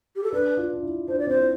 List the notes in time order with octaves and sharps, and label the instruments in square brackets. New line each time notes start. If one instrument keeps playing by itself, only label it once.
[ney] G4
A4
[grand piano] D4 [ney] B4
[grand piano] F4
D4
E4
[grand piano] D4 [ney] C5
[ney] D5
[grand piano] C4 [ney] C5
[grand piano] E4